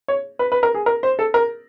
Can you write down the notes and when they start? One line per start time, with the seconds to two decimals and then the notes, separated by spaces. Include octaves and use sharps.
0.08 C#5
0.39 B4
0.52 B4
0.63 A#4
0.75 G#4
0.86 A#4
1.03 C5
1.19 A4
1.34 A#4